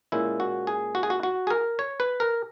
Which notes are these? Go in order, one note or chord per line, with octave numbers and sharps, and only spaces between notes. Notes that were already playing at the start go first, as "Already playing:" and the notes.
A#2 G#3 C#4 E4
F#4
G#4
F#4
G#4
F#4
F#4
G#4
A#4
C#5
B4
A#4